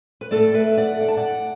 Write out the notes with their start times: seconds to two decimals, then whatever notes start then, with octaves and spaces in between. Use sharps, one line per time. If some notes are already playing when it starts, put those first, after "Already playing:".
0.21 B4
0.31 A2 A3 A4 D5
0.54 B4 E5
0.78 D5 F#5
1.01 F#5
1.08 A5
1.17 D5 F#5